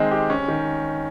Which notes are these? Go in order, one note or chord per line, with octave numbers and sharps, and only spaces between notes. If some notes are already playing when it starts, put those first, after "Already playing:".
Already playing: D#3 G#3 C4 G#4
G4
C#4
D#3